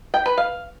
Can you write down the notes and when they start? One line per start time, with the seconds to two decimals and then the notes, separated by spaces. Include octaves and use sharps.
0.14 G5
0.26 B4
0.38 F5